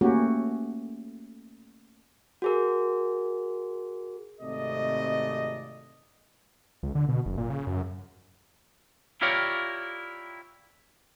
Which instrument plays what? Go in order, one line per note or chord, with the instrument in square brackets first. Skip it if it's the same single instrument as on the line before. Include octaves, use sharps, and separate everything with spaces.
[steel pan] A3 A#3 C#4 F#4 G4
[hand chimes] F#4 G#4 A#4
[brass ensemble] G#1 C3 A3 D5 D#5
[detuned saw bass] C#2
D3
B2
F#1
A#2
C#3
F#2
[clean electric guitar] E4 F4 G4 A#4 C#5 D5